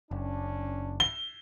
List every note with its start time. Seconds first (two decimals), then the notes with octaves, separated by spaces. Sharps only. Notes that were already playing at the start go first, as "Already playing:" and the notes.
0.11 F#1 C#4 D4
1.00 G7